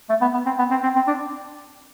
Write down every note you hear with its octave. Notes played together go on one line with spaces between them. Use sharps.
A3
B3
B3
C4
B3
C4
C4
C4
D4